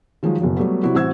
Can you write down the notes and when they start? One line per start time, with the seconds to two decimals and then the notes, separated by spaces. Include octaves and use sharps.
0.23 D#3 F3 F#3 G#3
0.41 F#1 B2 F#3
0.56 F#3 G3 A3 B3
0.83 C3 F#3 G3 E4 F#4
0.95 A1 C4 F#4 E6 G#6